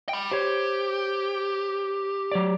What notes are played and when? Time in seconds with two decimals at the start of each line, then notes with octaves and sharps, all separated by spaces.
0.09 G5 B5
0.32 G4 C5 C#5
2.32 F#3 C#5 D5